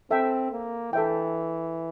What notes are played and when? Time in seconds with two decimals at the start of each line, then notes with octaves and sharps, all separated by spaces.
0.11 C4 A4 E5 G5
0.52 A#3
0.93 E3 A4 E5 G5